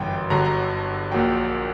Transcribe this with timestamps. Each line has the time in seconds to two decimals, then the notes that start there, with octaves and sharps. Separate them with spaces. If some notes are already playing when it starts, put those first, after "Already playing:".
Already playing: G1 F#2 E3 G3 G5
0.30 G1 G2 D3 F#3 A#5
0.45 A#5
1.12 A#1 A#2 F#3 G5